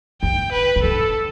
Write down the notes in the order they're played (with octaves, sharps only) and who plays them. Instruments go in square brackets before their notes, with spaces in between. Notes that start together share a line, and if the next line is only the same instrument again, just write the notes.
[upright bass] D3 [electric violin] G5
[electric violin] B4
[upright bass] C3
[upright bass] D3 [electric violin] A4